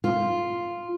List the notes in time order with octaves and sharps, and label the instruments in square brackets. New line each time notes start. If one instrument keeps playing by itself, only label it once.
[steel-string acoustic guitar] F4